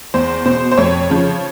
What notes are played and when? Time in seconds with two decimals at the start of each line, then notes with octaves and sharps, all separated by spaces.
0.14 E2 C5
0.46 B2 C5
0.72 C5
0.78 F2 C#5
1.10 C#3 F3